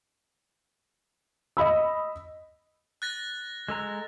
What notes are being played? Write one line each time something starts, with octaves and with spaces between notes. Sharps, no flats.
D#5 B5 E6
F#6 A6 A#6
G#3 A4 A#5